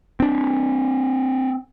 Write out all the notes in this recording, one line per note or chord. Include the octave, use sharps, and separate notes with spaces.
C4 D4